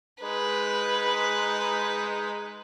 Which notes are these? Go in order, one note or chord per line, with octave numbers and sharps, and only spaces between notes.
G#3 D#4 B4